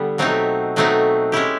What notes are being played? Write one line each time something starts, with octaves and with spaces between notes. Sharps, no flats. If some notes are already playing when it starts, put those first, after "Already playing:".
Already playing: D3 G3 B3
B2 F#3 A3 C4 D#4
B2 F#3 A3 C4 D#4
G#3 C#4 E4 G4